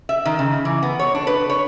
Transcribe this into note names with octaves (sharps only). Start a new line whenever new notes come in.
E5
D#3
C#3
E3
B3
C#5
D4
B4
C#5